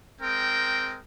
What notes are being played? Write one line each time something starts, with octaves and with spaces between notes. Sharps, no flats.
G#3 C4 A#4 G5